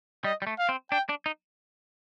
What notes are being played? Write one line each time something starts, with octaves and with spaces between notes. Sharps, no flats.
G3 D#5
G3
A3
F5
C4
D4 G5
D4
D#4